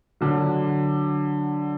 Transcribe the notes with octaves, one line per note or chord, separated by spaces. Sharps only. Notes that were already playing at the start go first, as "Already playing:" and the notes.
D3 F#3